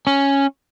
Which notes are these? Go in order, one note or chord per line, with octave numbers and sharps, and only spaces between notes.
C#4